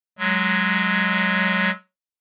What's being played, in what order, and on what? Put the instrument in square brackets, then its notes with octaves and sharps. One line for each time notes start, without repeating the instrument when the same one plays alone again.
[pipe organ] F#3 G#3